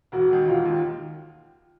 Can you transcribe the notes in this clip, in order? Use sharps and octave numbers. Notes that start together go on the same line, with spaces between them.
E1 F#4
D#2 D#3
E1 F4
D#2 D#3